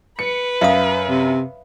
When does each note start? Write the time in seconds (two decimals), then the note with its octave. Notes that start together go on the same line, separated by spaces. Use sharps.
0.19 B4 C#7
0.61 F#2 E5 F5 D#6
1.09 C3